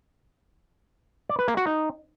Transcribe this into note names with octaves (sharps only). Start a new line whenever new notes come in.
D5
B4
A#3
F#4
D#4